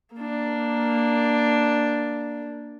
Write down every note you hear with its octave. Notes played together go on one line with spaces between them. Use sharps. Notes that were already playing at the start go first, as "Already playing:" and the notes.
A#3 D4